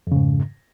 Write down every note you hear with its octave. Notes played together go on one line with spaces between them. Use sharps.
F2 G#2 C#3